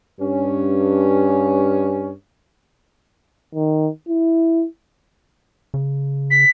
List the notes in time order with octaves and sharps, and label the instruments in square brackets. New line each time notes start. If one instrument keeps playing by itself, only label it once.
[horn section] G2 C#4
[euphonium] D#3
E4
[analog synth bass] C#3
[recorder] B6